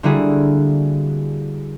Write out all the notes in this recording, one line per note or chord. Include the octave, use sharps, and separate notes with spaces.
D3 G3 A#3 E4 F#4 G#4